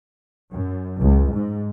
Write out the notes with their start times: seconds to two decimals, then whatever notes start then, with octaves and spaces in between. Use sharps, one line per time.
0.51 F#2
1.01 C#2
1.32 G#2